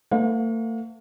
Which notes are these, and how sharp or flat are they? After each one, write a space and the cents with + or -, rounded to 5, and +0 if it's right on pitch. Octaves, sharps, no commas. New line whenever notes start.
A3 +45 B4 +40 F5 +45